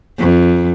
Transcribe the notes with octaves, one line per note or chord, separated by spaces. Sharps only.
F2